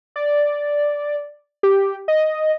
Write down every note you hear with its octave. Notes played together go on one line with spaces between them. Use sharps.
D5
G4
D#5